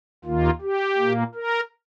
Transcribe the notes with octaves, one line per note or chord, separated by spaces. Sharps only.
D#2 D#3 A#3 F4
G4
A#2 A#3
A#4